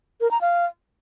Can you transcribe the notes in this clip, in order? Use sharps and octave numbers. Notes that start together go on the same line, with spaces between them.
A#4
A#5
F5